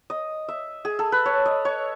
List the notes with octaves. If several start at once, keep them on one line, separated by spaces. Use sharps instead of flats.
D#5
E5
G#4
A4
B4
C#5
D#5
C#5